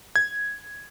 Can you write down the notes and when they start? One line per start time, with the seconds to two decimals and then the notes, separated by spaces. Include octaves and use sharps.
0.16 G#6